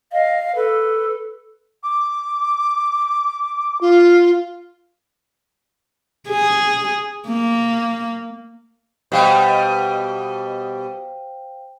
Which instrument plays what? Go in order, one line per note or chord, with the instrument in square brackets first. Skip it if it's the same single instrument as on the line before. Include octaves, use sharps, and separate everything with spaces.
[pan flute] D#5 [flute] F5
[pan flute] A4 [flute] B4
[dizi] D6
F4
[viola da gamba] G#4
A#3
[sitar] B2 G3 [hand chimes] C5 F5 G5